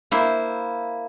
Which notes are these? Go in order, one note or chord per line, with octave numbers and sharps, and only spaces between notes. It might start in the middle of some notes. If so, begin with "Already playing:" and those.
A#3 E4 C5